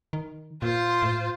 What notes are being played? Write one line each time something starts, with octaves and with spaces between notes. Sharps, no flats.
D#3
A#2 F4 C5
A2